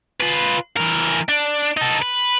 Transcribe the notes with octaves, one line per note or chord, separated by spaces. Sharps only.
F4 B4
E3 A#4
D4
D#4 A4
B4